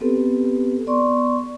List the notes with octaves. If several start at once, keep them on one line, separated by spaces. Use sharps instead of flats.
B3 C4 G4 A4 B4
B3 D5 C6 C#6